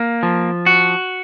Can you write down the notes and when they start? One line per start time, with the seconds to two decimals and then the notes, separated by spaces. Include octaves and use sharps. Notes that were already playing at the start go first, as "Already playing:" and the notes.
Already playing: A#3
0.23 F3
0.66 F#4